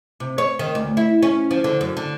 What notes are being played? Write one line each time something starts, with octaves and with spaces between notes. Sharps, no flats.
C3
C#5
D#3
D2
E4
C#4
F3
D3
F#2
D3